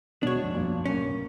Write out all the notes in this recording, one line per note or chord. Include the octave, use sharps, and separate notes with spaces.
D#1 B2 G#3 B3 D4 F#4 C#5
B1 F2 B2
G2 A#2
F1 F#2 A2 A#3 C#4
B1